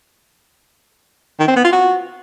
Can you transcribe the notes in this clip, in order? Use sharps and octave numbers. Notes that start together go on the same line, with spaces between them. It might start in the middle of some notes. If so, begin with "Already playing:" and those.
D#3
C4
B3
F4
F#4